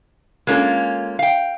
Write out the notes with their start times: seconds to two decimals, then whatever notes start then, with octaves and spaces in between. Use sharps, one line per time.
0.47 G#3 A#3 C#4 F4 A4
1.19 F5 G5